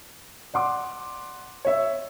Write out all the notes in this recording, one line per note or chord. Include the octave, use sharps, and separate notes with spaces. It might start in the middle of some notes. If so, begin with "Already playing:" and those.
D5 F#5 C6 D6
C#5 E5 E6